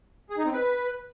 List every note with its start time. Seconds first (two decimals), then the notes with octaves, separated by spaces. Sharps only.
0.30 G#4
0.38 D#4
0.45 C4
0.53 B4